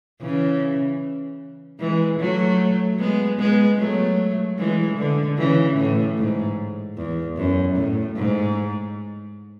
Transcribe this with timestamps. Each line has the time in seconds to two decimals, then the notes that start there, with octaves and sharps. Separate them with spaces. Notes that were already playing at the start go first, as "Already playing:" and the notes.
0.21 C#3 E3
1.80 E3 G#3
2.19 F#3 A3
2.99 G#3 B3
3.39 G#3 B3
3.78 F#3 A3
4.58 E3 G#3
4.98 D3
5.37 C#3 E3
5.77 A2
6.17 G#2
6.96 E2
7.36 F#2
7.76 A2
8.16 G#2